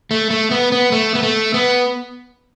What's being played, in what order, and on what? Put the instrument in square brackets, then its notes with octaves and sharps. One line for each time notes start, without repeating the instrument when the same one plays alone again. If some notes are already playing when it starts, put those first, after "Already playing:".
[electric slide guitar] A3
A3
B3
B3
A3
B3
A3
B3